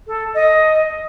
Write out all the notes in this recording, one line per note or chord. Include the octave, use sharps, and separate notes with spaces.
A4
D#5